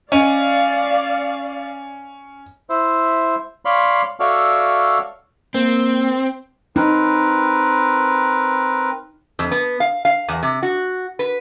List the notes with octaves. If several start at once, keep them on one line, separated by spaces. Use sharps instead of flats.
C#4 D5 D#5 F5
E4 C5 E5
C#5 D5 F5 B5 C6
F#4 A4 C#5 D5 E5 F5
A#3 C4
C4 D#4 A#4 B4
F2
B3
F5
F5
E2
C3
F#4
B4